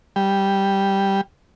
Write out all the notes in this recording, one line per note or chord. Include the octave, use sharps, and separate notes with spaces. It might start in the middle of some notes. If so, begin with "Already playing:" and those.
G3